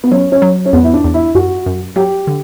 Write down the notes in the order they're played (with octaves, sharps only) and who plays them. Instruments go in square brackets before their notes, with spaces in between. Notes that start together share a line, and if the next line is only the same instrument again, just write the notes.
[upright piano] B3
[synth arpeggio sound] F#3 [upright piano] C#4
[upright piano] C#4
[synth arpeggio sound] F#3
[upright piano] C#4
[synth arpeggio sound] E2 [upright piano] B3
[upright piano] E4
D4
[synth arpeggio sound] E2
[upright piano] E4
[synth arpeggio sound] F#2 [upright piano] F#4
[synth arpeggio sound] F#2
[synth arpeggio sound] F#3 [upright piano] G4
[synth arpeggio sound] D3